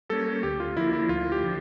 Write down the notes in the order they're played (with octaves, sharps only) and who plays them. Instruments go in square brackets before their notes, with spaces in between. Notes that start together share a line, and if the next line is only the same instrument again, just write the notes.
[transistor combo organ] G3 A#3 C#4 [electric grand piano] A4
[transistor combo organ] D2 [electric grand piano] G4
[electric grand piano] F4
[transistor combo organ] D3 F3 A#3 [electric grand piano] E4
[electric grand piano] E4
[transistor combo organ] D2 [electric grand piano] F4
[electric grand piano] G4
[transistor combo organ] D3 F3